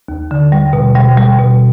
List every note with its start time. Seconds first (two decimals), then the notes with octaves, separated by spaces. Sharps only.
0.08 D#2
0.31 D3
0.52 G3
0.73 B2
0.95 G3
1.17 G3
1.39 B2